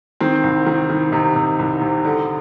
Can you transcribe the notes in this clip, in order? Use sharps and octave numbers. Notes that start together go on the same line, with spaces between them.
D#3 C4
C2
D#3
D#3
C3 D#4
C3
C2
C3
D3